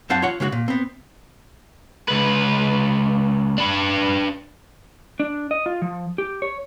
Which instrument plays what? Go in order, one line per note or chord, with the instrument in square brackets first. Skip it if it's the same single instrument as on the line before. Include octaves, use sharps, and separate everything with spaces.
[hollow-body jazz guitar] F#2 C4 C5 F5 F#5 A5
F4 C#5 F#5
C#3 G#3 F4 F#4
A#2
B3 C4
[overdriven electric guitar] C#2 B4
D4 B4
[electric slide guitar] D4
D#5
F4
F3
G4
C#5